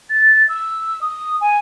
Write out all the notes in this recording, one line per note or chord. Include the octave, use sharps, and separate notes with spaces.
A6
E6
D#6
G#5